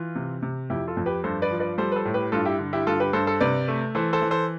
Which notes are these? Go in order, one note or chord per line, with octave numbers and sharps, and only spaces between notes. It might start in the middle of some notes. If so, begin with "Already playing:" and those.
Already playing: E3 F4
C3
C3
F2 E4 G4
F4 A4
F2
G4 B4
G2 A4 C5
B4 D5
F3
B4 D5
G3 A4 C5
B4
A4 C5
A2
G4 B4
G2 F4 A4
E4 G4
D3
E4 G4
G2 F4 A4
G4 B4
G2 A4 C5
A4 C5
C3 B4 D5
A3
E3 A4 C5
A4 C5
E3
A4 C5